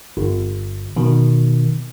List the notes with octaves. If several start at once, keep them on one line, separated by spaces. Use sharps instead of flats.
G1
B2 D#3